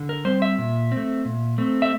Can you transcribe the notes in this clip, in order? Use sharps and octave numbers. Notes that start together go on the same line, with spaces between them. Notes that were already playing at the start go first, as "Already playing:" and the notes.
Already playing: D3
A#4
G3 C4 C5
E5
A#2
A3 C4
A#2
A3 C4
E5